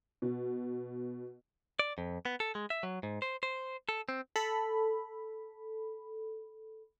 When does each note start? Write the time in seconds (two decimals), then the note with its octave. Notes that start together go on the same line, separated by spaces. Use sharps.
0.22 B2
1.79 D5
1.98 F2
2.25 B3
2.40 A4
2.55 G#3
2.70 E5
2.83 F#3
3.03 G#2
3.22 C5
3.43 C5
3.89 A4
4.09 C4
4.36 A4 B5